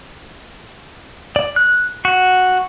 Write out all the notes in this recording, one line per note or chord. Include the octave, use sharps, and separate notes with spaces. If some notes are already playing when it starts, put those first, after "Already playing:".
D5
F#6
F#4